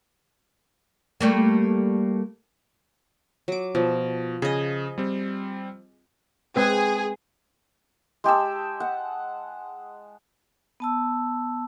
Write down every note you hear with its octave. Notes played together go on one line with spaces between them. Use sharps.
G3 A3 A#3
F#3 D6
B2 F3
C#3 G#4 D#5
G3 C4
G#3 C4 G#4 B4
G#3 G4 A5 E6
F#5
B3 A5 E6